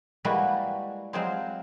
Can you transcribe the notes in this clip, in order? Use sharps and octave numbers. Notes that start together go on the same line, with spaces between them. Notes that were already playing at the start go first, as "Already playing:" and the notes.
G3 G#3 A#3 E4 F#4 B4
F#3 G#3 C4 F4 G#4 C5